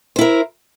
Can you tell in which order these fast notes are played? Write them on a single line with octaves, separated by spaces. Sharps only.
C5 E4 A#4